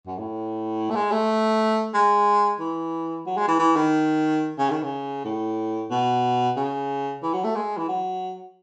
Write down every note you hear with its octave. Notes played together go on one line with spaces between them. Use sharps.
F#2
A2
A3
G#3
A3
G#3
E3
F#3
G#3
E3
E3
D#3
C#3
D#3
C#3
A2
B2
C#3
E3
F#3
A3
G#3
E3
F#3